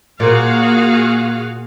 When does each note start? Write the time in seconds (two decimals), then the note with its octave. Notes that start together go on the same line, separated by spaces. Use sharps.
0.20 A#2 F#4 G#4 F5